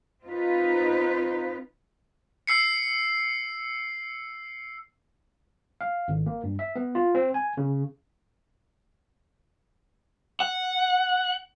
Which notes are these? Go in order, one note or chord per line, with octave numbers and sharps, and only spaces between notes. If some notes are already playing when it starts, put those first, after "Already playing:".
C4 D#4 F4 B4
E6 C7 C#7
F5
G#1
A#3
G2
E5
B3
F4
C4
G#5
C#3
F#5